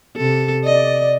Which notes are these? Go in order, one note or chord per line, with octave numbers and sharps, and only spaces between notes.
C3 A4
D5 D#5